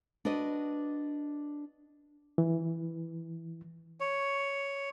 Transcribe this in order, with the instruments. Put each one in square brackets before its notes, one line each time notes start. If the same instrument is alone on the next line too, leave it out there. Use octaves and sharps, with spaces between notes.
[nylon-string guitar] D4 F#4 B4 D#5
[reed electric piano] E3
[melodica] C#5